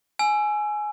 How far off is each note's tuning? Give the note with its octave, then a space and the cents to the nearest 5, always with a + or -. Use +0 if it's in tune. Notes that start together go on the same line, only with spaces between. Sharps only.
G#5 +15 E6 +25